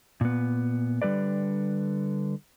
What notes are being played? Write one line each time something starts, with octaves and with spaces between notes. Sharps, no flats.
A#2 B3
D3 G3 A#4 B4 D5